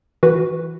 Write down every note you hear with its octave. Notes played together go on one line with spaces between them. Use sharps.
E3 F#4 B4